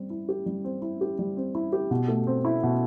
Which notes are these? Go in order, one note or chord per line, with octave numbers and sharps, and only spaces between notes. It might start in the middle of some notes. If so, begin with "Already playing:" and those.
Already playing: G3 C4
E4
G4
G3
C4
E4
G4
G3
C4
E4
G4
B2
A3
C4
E4
B2